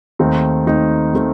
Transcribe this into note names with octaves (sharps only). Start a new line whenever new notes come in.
D#2 D#3 A3 C4 D#4
D#2 D#3 A3 C4 D#4
D#3 A3 C4 D#4